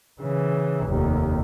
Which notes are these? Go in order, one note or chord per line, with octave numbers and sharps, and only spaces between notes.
C#3 E3
F1 D#2